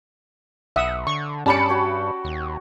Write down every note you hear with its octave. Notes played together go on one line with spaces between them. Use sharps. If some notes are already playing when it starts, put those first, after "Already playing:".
B1 E5 F#5 D#6
D3 C#6
G2 C#4 G4 D5 A5 B5 C#7
F#4 C#5 G5
D#2